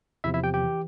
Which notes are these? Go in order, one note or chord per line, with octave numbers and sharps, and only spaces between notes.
E2 C3 F3 E4 E5
E4 E5
G4 G5
G4 G5
E3